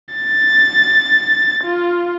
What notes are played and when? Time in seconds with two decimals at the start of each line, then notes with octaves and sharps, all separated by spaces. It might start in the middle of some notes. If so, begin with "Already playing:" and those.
0.15 A6
1.64 F4